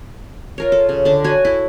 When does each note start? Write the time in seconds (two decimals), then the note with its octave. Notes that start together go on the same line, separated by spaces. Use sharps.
0.58 F4 A#4 C#5
0.72 A4
0.89 C#3
1.05 D3 A5
1.24 F#4 C#5 G#5
1.45 E4 A4